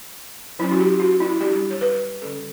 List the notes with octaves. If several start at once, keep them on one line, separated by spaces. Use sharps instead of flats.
F#3 C#4 E4
F#4
G4
F#4
E4
G3 D4 G4
C#5
B4
D3 G3 C#4 A4